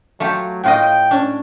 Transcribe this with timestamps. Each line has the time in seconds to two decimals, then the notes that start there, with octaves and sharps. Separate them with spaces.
0.20 F#3 A3 F4 G4
0.64 A2 F4 D#5 G5
1.11 C#4 D4